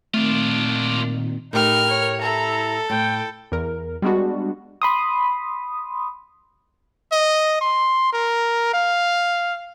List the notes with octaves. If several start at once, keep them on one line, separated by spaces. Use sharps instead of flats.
A#2 D#3 A3 C4 D4 F4
A2 D#4 G4 A#4 F6
C#5
E4 A4 A#5
A2 G5
E2 A#4
G3 G#3 B3 D4 F#4
B5 C6 D#6
D#5
C6
A#4
F5